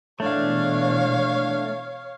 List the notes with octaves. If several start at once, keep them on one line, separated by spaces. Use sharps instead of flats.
B2 E3 G#3 A3 D4 C#5 F5